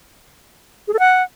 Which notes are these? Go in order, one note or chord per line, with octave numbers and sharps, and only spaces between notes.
G#4
A4
F#5